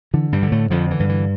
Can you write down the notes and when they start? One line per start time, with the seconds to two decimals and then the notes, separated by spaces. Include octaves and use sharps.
0.14 D3 E3
0.32 G2 G3
0.43 D3
0.52 A2 A3
0.70 F2 D3 F3
0.91 E3
1.00 G2
1.09 E3